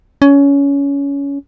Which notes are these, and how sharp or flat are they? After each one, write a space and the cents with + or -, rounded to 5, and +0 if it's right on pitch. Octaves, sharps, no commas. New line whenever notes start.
C#4 +20